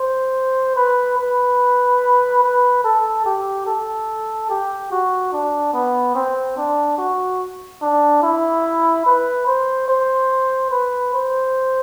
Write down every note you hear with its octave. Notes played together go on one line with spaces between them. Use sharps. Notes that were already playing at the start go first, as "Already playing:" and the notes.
Already playing: C5
B4
B4
B4
A4
G4
A4
G4
F#4
D4
B3
C4
D4
F#4
D4
E4
B4
C5
C5
B4
C5